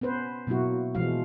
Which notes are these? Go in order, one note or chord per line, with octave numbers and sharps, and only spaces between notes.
B3 C#4 B4 C5
B2 F#3 A#3 E4 F#4
B2 E3 F3 G#3 F#4 F5